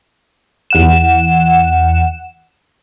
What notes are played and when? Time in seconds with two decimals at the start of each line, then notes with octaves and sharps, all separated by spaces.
0.70 E2 F#5 E7